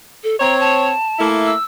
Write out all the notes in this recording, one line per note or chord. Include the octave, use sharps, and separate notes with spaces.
A4
C4 C#5 A#5
A5
A3 A#3 E4
E6